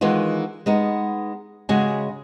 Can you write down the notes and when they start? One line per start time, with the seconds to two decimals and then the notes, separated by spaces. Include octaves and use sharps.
0.01 D#3 E3 G#3 B3 F4
0.66 G#3 B3 D#4
1.69 C#3 G#3 F#4 G#5